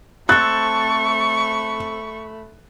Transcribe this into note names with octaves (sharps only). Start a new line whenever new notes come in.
A3 C4 A4 B5 C#6 F#6 A6